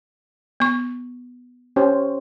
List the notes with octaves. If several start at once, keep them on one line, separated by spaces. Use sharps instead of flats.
B3 C#6
C#4 G4 C5